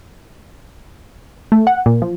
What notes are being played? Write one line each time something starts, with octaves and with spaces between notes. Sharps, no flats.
A3
F#5
A#2
F3